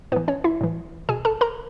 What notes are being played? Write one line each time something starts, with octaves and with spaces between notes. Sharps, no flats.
A2 E3 B3 B4
C#4 C#5
E4 E5
A2 E3
B2 G#4 G#5
A4 A5
A#4 A#5